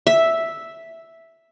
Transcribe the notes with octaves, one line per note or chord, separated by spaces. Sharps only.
E5